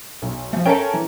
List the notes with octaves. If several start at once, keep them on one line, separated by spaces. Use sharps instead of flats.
B1
F3 A3
C#4 A4 A#4 E5 G5 A5
E3